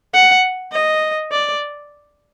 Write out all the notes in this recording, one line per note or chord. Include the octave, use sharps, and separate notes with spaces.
F#5
D#5
D5